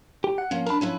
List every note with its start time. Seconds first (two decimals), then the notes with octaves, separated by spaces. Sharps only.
0.24 G4
0.38 F#5
0.51 F3 A#3 C#4
0.66 D4 A#4 A5 B5
0.81 F3 C#4 E4 B4